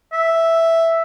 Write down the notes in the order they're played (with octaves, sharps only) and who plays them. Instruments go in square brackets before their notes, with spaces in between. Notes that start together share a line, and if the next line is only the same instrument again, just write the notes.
[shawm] E5